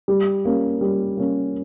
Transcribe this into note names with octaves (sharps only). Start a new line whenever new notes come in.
G3
A#3 C#4
G3
A#3 C#4